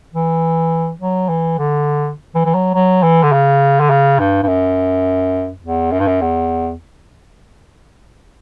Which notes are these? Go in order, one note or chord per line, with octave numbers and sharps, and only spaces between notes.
E3
F#3
E3
D3
E3
E3
F#3
F#3
E3
D3
C#3
D3
C#3
G2
G2
F#2
E2
F#2
G2
F#2
E2